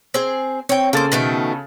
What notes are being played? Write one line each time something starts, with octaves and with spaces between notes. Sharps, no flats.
C4 G#4
C4 C#5 G5
C#3 A#3 A4 C5 A6
B2 D#3 A3